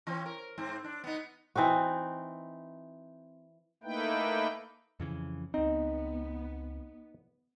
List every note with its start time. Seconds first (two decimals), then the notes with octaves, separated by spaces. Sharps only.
0.07 E3 C4 C#4
0.26 A#4
0.58 G#2 C4
0.84 D4
1.04 B3 D#4
1.56 E3 C4 D#4 F#4
3.84 A3 A#3 D#4 E4 B4 G5
5.00 F2 C#3 E3
5.54 C#2 B3 C4 D#4